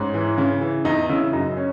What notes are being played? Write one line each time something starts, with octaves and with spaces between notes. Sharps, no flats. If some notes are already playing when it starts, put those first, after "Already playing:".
Already playing: G#2 C#4
E3
C#3
E3
E2 D#4
C#3 E4
F#2 D#4
C#4